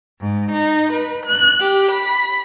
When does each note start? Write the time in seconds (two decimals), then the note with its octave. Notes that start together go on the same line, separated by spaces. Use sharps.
0.21 G#2
0.52 D#4
0.93 B4
1.26 F#6
1.60 G4
1.90 B5